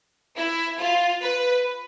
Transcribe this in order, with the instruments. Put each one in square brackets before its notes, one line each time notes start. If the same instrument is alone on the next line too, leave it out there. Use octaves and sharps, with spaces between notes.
[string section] E4
F4
B4